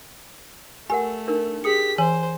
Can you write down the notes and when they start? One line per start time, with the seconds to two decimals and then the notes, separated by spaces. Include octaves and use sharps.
0.90 A3 G4 A#4 F#5 G#5
1.28 D4 D#4 A#4
1.64 G4 G#4 D#6 B6 C#7
1.98 E3 C5 G#5